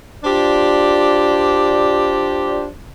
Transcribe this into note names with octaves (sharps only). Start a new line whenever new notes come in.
D4 F4 G4 C5 D5